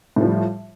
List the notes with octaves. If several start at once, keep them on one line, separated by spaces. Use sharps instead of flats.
A2 F3 G3